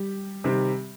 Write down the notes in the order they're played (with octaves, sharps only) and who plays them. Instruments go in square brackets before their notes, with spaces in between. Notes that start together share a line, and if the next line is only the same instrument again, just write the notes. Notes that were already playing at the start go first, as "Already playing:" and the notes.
Already playing: [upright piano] G3 G4
[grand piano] C3 D#3 G3 C4